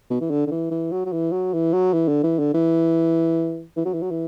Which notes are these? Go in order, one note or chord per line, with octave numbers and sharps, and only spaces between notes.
B2
E3
D3
D3
E3
E3
F#3
F#3
E3
F#3
E3
F#3
E3
D3
E3
D3
E3
E3
F#3
E3
F#3
E3